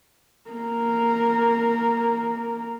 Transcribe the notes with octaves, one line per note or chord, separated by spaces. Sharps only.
A#3 A#4